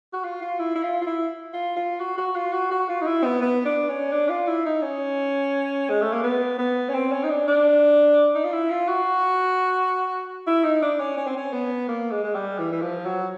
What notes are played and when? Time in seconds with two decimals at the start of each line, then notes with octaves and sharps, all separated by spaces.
0.13 F#4
0.24 F4
0.42 F4
0.59 E4
0.75 E4
0.83 F4
1.02 F4
1.07 E4
1.54 F4
1.76 F4
2.00 F#4
2.18 F#4
2.36 F4
2.53 F#4
2.71 F#4
2.89 F4
3.01 D#4
3.07 E4
3.24 B3
3.41 B3
3.66 D4
3.89 C#4
4.12 D4
4.29 F4
4.47 E4
4.66 D#4
4.82 C#4
5.90 G#3
6.01 A3
6.13 A#3
6.23 B3
6.58 B3
6.89 C#4
6.94 C4
7.12 C#4
7.23 D#4
7.30 D4
7.47 D4
8.35 D#4
8.44 F4
8.52 E4
8.70 F4
8.89 F#4
10.47 E4
10.64 D#4
10.82 D4
11.00 C#4
11.17 C#4
11.27 C4
11.37 C#4
11.53 B3
11.89 A#3
12.11 G#3
12.24 G#3
12.35 G3
12.58 E3
12.72 E3
12.82 F3
13.06 F#3